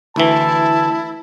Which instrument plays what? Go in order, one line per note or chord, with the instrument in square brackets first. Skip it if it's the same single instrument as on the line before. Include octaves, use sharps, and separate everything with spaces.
[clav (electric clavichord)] D2 E3 [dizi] E4 [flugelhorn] A5